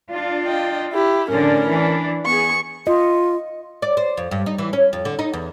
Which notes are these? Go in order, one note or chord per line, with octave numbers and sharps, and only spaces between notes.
D4 F4
D#5 G5
E4 G4
A2 D3 C#4 D4 A#4
E3 D4
B3 G#4 C#6
F4 D#5
D5
C5
F2
G2
D#4
E3
C#4
F2
D3
D#4
E2